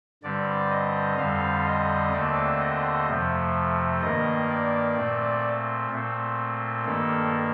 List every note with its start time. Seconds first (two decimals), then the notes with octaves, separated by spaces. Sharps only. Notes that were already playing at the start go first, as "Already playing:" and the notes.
0.23 G2 D3 G3 C4 D5
0.70 D#5
1.17 F2 D3 G3 C4 F5
1.66 D#5
2.12 D#2 D3 A3 C4 D5
2.60 D#5
3.07 F2 C3 F3 A3
4.01 G2 D#3 A#3 D#5
4.49 D5
4.96 A#2 A3 C4
5.91 A#2 A3 C4
6.85 G2 D#3 A#3 A4